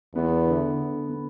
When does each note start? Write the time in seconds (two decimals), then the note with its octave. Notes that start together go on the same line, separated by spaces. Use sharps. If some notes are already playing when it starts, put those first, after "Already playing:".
0.14 E2 B3
0.46 D3
0.78 D3
1.09 B3